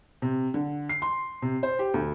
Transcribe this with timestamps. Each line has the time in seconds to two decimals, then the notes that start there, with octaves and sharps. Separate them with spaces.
0.22 C3
0.54 D3
0.89 C7
1.02 C6
1.42 C3
1.63 C5
1.79 G4
1.94 D2